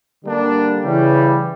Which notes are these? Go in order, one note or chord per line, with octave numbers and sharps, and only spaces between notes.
D3 G3 A#3 D4
C#3 E3 G3